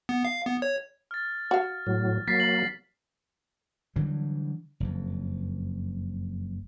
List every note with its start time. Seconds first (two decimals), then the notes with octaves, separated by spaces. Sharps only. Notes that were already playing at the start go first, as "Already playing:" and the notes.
0.09 B3
0.25 F5
0.46 B3
0.62 C#5
1.11 F6 A6
1.51 F#4 F5
1.87 A2 F#3
2.28 F#3 A#3 A6 B6 C7
2.40 F#7
3.96 D3 E3 F#3 G3
4.80 F#1 F2